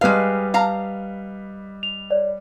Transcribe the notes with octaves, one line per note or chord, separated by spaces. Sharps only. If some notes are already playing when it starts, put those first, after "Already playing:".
G3 G#3 B4 D#5 F5
F5 A#5
F7
C#5 D5